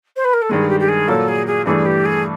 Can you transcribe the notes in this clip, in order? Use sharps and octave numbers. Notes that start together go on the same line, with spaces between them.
C5
B4
A#4
A4
G2 D#3 G#3 G#4
G4
G4
G#4
A#2 F#3 A#3 A4
G#4
G#4
G2 E3 A3 D4 G#4
G4
G#4